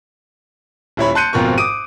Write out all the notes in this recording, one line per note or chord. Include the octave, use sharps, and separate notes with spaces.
D#1 E4 C#5 B5
A5 C6 F#6 G6 C#7 D#7
G#1 F2 B2 F4 A#4 C#6
D6 D#6 D7 D#7